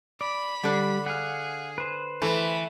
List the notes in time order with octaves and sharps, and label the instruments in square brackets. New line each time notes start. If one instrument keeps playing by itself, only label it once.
[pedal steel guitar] D5 [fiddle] B5
[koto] D3 D4 [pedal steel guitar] G3
[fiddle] G#4 [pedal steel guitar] F5 F#5
[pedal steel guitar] B4 C5
[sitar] E3 [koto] A3 [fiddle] A5 B5